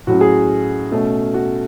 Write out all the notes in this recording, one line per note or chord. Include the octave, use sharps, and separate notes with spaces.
A2 F#3 C#4 F#4
G#4
B2 A3 C#4
F#4